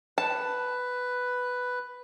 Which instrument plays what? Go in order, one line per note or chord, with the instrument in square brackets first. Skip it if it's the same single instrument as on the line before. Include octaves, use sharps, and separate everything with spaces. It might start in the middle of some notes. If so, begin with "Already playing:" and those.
[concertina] B4 [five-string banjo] A5